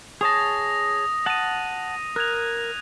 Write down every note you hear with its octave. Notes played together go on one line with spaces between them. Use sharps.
G#4 C#5 A5 D#6 A#6
F#5 A5 D#6 D#7
A#4 F#6 G#6 F7